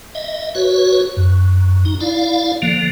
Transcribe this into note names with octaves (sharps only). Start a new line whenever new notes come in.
D#5 E5
F#4 B4 C#5
F#2
D#4
E4 D5 F5
D3 F3 A#3